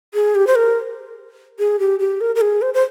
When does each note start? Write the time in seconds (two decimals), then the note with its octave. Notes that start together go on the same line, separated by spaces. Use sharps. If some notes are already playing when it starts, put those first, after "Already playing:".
0.14 G#4
0.35 G4
0.47 C5
0.55 A#4
1.59 G#4
1.79 G4
2.00 G4
2.21 A#4
2.35 A#4
2.41 G#4
2.62 C5
2.74 C5